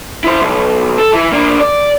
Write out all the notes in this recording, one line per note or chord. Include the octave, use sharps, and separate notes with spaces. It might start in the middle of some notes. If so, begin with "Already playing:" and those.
E4 C5
B1
A4
E3
A#3 D4
D5